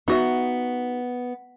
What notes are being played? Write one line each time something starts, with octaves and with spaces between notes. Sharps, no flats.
B3 D#4 F#4 E5